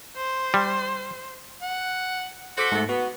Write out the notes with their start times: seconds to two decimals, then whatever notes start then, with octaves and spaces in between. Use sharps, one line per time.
0.16 C5
0.54 G3
1.62 F#5
2.58 F#4 A4 C5 D6 B6
2.72 G#2 A3
2.89 B3 F#4